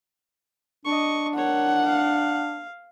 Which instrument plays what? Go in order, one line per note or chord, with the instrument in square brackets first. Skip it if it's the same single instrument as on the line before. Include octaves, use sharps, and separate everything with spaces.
[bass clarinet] D4 [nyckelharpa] D#5 C#6
[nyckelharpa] A#4 C#5 [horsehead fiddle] F#5
[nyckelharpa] F5